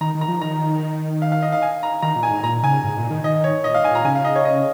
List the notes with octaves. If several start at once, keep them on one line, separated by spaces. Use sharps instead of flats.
D#3 A#5
D#3
A#5
F3
D#3 A#5
F5
F5
D#5
F5
G#5
A#5
D#3 A#5
A#2
G#5
G#2
A#2 A#5
C#3 G#5
G#2
A#2
D#3
D#3 D#5
C#5
A#2 D#5
F5
G#2
G#5
A#2 A#5
C#3 G#5
F5
D#5
C#5
D#5